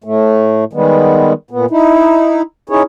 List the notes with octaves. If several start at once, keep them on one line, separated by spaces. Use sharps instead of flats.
A2 A3
D#3 G3 G#3 B3
A#2 B3
D#4 E4
C#4 D#4 E4 G#4 C#5